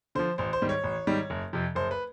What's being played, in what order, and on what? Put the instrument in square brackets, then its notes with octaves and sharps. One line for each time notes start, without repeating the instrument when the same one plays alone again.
[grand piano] D3 F3 C5
A1 C5
C5
G#2 D#3 G3
C#5
A1
G#2 D#3 G3
F#1
F2 C3 F3
F#1 C5
B4